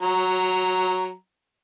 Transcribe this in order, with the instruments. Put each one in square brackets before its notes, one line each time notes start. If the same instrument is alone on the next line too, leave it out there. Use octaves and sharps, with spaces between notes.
[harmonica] F#3 A#5